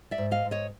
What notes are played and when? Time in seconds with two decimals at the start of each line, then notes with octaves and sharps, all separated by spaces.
0.11 D5 E5
0.18 G#2
0.31 D#5 F5
0.45 G#2
0.51 C#5 D#5